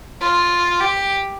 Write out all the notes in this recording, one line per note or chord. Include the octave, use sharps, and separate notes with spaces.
F4
G4